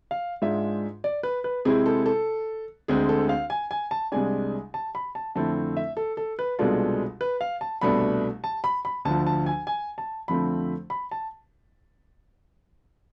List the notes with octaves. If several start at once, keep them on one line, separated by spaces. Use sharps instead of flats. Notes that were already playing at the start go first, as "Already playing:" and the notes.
F5
G#2 G#3 D4 F4 E5
D5
B4
B4
C3 G#3 C4 E4 G#4
A4
A4
D2 D3 G#3 C4 G#4
A4
F5
G#5
G#5
A5
C2 C3 G#3 D4 G#5
A5
B5
A5
F2 D3 A3 C4 E4 A5
E5
A4
A4
B4
C2 B2 G#3 D4 F4 A4
B4
F5
A5
C2 B2 A3 D4 B5
A5
B5
B5
D2 D3 F3 A5
A5
G#5
G#5
A5
F2 D3 F3 A3 C4 B5
B5
A5